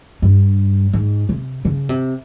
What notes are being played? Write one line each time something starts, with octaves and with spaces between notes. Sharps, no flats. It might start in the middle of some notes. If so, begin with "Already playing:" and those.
G2
G#2
C3
C#3
C3